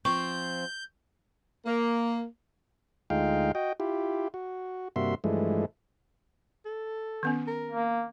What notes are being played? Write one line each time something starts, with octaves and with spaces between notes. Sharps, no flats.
F3 C4 C#6 G6
A#3
D2 G#3 D#4 F4 F5 G5
F#4 D#5 G5
E4 F4 G4
F#4
G2 C3 A#3 F#4 E5 C6
G2 E3 F3 G#3 A3
A4
D#3 B3 C#4
A#4
A#3